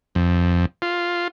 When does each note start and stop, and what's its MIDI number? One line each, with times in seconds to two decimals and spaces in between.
0.15 0.65 41
0.82 1.28 65